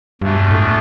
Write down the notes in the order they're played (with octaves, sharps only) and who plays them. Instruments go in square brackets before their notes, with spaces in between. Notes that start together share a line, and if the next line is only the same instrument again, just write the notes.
[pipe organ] E2 B2 A3 D4 F4 [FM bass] G2
[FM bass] A2